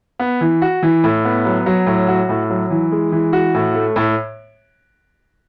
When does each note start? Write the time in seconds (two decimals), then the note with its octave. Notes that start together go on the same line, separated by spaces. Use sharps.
0.19 B3
0.41 E3
0.62 F#4
0.83 E3
1.04 A2
1.25 B3
1.45 F#3
1.66 F#3
1.86 A2
2.08 F#4
2.29 A2
2.50 F#3
2.70 E3
2.92 G#3
3.12 E3
3.33 F#4
3.55 A2
3.74 A3
3.96 A2